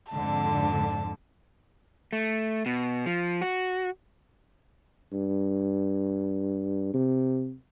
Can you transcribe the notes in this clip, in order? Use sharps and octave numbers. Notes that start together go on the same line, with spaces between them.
F2 G#2 D3 A5
A3
B2
F3
F#4
G2
C3